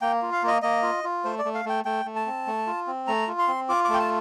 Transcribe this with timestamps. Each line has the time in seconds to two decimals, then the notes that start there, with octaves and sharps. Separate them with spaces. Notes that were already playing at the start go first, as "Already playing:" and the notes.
0.01 A#3 G5
0.22 F4
0.32 F5
0.43 A#3 D#5
0.62 A#3 D#5
0.83 F4
1.04 F4
1.24 A3 C5
1.39 D5
1.45 A3
1.54 F5
1.65 A3 G5
1.85 A3 G5
2.05 A3
2.16 A5
2.26 C4
2.47 A3
2.67 F4
2.87 C4
3.07 A3 A#5
3.27 F4
3.39 C6
3.48 C4
3.69 F4 D6
3.85 A3 D6
3.94 G5
3.99 A5